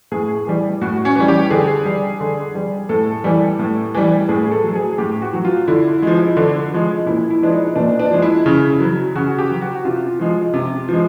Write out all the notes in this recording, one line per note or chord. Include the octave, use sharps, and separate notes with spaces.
A2 G#4
E3 G3
A2 F#4
C#4
E3 G3
G4
D3 G#4
G3
D3
G3
A2 A4
E3 G3
A2
E3 G3
A2 G#4
A4
F#3
G#4
A2 G4
F#4
F#3
F4
D3 E4
F3 G#3
D3
F3 G#3
A#2 E4
E4
F3 G#3 D4
D#4
A#2 D4
D4
F3 G#3
E4
C#3
F#3
C#3 F#4
G4
F#3
F#4
C3 F4
F3 G#3
C3
F3 G#3